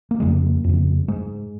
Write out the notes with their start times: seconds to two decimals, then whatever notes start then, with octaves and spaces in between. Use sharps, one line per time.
0.11 A#3
0.20 F2 C#3 G#3
0.29 A#3
0.64 F2 C#3
1.08 G#2 G#3